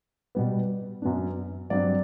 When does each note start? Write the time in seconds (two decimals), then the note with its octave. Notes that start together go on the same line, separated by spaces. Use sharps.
0.35 B2 G3 B3
1.02 F#2 F#3 B3 D4
1.70 G2 F#3 C4 D5